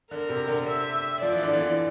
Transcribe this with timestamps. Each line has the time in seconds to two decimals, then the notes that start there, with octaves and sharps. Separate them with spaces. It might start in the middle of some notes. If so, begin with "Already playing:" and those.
0.11 D3 A#4
0.29 C3
0.48 D3
0.67 E5
1.22 F3 D5
1.32 E3
1.43 D3
1.53 E3